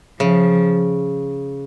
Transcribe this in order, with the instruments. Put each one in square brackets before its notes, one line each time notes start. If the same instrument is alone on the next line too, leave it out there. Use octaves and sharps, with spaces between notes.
[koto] C#3 [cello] F3